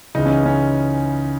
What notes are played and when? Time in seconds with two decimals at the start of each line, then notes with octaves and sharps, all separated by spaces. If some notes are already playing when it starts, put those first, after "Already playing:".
0.15 C#2 C#3 E3 G#3 D#4
0.25 C#4
0.46 C#4